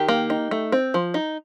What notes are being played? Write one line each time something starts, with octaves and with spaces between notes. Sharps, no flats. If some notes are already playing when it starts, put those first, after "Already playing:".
Already playing: D#3 G4
A#3
D#4
A3
C4
F3
D#4